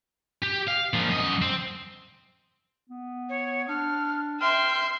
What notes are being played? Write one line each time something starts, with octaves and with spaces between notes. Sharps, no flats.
G4
F5
A#2 F3
F#2 D#5
C4
B3
C#5
D4 F6
E5 G5 C6 F6